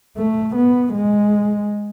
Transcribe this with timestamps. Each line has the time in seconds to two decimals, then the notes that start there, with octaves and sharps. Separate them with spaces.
0.17 A3
0.55 B3
0.93 G#3